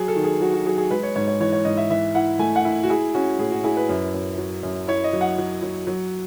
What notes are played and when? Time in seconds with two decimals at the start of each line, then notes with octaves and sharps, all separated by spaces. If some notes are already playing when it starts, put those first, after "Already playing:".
Already playing: F#3 G#4
0.08 A4
0.16 D#3
0.24 G#4
0.41 F#3 F#4
0.54 F#4
0.66 F#3 G#4
0.78 G#4
0.91 G#3 B4
1.03 C#5
1.16 G#2 C#5
1.28 C#5
1.40 E3 C#5
1.53 C#5
1.65 G#2 D#5
1.77 E5
1.90 E3 E5
2.15 E4 F#5
2.39 A3 G#5
2.56 F#5
2.65 E4
2.83 F#4
2.90 E4 G#4
3.14 C#4 F#4
3.39 A2 G#4
3.51 F#4
3.64 E4 G#4
3.77 B4
3.89 F#2
4.14 F#2
4.38 F#3
4.63 F#2
4.87 E4 C#5
5.04 D#5
5.13 F#3
5.21 F#5
5.38 F#3
5.62 F#3
5.87 F#3